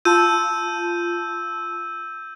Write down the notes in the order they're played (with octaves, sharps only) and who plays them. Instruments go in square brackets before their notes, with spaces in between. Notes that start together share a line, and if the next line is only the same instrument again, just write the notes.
[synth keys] F4 A5 [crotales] E6 G6 D#7